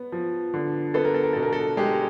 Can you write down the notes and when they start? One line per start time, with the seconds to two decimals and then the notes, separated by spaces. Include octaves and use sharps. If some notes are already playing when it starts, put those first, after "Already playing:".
Already playing: B3
0.12 F3
0.54 D3
0.94 B3 A4
1.05 A#4
1.14 A4
1.23 A#4
1.33 B2 A4
1.43 A#4
1.53 A4
1.77 G#3 G4